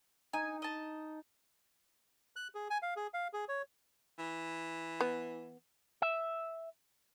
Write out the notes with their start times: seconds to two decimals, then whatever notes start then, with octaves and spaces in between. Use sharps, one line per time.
0.33 D#4 G#5
0.62 D#5 A5
2.36 F#6
2.55 G#4
2.70 G#5
2.82 F5
2.96 G#4
3.14 F5
3.33 G#4
3.49 C#5
4.19 E3
5.01 B3
6.02 E5